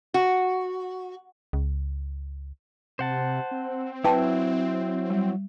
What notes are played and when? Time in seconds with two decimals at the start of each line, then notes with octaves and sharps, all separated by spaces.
0.14 F#4
1.53 C#2
2.99 C3 C5 F#5 A5
3.51 C4
4.04 F#3 E4 B4 G5 A5
5.10 G3